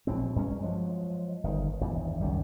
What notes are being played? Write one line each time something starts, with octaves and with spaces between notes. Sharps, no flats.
A#1 B2 F#3 C4
G2 G#3 C#4
F3 F#3 G#3
G1 D#3
G#1 E2 G2
C#2 F#2 D#3 G3